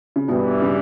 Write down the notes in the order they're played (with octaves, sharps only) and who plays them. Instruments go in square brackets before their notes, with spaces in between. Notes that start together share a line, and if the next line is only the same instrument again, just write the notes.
[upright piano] C#3
[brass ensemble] G2 E3 G3 [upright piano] B2
[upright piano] C#3